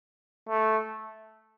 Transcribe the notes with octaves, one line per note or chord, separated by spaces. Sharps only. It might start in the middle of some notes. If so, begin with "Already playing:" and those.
A3